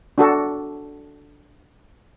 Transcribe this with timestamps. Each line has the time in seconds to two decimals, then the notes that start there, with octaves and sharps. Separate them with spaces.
0.18 D4 F#4 A4